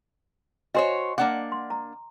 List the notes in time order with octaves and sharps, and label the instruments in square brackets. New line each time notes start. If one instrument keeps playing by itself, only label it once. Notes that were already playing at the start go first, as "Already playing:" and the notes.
[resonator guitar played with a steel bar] F#4 C5 C#5 [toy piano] D#5 G#5 C6
[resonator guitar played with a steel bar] A#3 D4 F#5 [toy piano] D6
[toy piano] C6
A#5